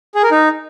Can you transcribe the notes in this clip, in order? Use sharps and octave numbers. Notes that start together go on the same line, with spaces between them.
G#4
A#4
D#4